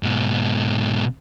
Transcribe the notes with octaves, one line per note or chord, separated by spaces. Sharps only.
G#2 B2